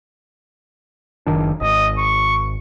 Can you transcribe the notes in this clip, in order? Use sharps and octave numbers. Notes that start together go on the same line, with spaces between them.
F#1 D#3 D4
G#1 D#5
C#6